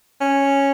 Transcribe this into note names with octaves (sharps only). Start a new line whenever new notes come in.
C#4